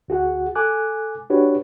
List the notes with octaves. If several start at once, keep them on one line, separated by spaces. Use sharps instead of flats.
D2 F#4 G#4 F#5
A4 G#5 D6 F#6
D4 F#4 G4 B4 C#5 D5